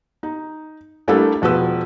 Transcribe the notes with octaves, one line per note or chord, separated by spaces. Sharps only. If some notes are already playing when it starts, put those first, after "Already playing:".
D#4
G3 A3 A#3 D4 E4 A4
E1 F3 F#4 B4 E6